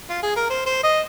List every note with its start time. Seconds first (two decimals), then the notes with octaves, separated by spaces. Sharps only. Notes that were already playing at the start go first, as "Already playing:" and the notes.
0.10 F4
0.23 G#4
0.36 A#4
0.50 C5
0.66 C5
0.83 D#5